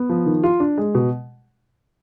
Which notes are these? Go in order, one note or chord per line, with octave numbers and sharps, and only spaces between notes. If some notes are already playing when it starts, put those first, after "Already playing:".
Already playing: B3
F3
D#3
F4
D4
G#3
B2